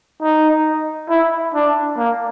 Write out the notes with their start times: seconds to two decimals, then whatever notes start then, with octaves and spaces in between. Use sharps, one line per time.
0.22 D#4
1.10 E4
1.54 D4
1.98 A#3